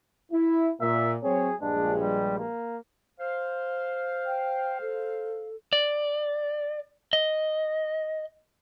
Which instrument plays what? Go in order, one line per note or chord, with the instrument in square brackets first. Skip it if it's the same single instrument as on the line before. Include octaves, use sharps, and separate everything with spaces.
[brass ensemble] E4
[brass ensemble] A#2 [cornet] E5
[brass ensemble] F#3 C4 C#5 [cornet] G#4
[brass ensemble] A#1 G2 G#3 [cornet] D4
[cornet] G3
A#3
[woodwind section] C5 F5
[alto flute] G5
A4
[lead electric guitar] D5
D#5